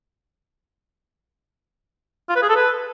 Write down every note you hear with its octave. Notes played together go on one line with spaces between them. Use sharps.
F4
B4
G#4
A4
B4